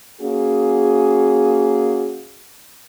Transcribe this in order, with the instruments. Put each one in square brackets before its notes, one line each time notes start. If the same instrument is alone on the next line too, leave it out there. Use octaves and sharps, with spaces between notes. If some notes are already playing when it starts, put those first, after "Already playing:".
[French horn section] A#3 C#4 F#4 G#4